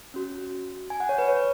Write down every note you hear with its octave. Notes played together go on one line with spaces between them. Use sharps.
C#4 F#4
G#5
F#5
C#5
B4
C#5